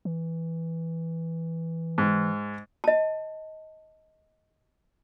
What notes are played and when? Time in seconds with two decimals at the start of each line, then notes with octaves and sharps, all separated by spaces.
0.05 E3
1.98 G#2
2.84 D#5 A5